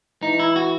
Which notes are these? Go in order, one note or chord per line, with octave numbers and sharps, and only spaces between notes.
E3 D#4
E4
F#4